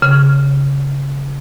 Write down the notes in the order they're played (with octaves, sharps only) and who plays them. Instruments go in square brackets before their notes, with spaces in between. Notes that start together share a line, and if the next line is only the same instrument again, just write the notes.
[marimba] C#3